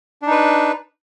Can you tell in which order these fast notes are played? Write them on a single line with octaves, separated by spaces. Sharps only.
D4 D#4 B4